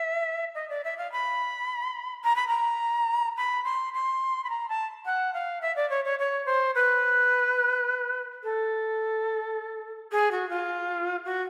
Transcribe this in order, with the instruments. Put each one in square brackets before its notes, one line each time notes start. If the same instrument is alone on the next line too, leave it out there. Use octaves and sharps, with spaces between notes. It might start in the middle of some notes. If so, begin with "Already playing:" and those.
Already playing: [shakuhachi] E5
D#5
D5
E5
F5
B5
A#5
B5
A#5
B5
C6
C6
B5
A#5
A5
F#5
F5
E5
D5
C#5
C#5
C#5
C5
B4
A4
G#4
F#4
F4
F#4